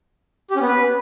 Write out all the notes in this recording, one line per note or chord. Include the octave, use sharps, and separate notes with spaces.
G4
C#4
B3
B4